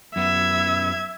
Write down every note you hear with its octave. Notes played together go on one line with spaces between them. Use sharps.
F#2 B3 E5 G#6